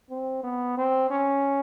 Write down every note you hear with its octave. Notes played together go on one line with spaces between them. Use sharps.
C4
B3
C4
C#4